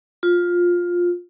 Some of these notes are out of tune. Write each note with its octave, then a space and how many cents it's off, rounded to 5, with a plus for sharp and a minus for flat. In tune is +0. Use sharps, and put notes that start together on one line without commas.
F4 +10